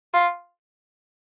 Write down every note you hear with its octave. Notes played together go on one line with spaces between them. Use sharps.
F4